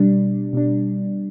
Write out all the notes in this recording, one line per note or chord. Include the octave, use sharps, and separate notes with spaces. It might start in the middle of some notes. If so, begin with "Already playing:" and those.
Already playing: B2 G3 D4
B2 G3 D4